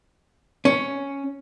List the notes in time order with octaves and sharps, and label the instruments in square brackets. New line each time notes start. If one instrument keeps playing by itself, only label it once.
[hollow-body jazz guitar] C#4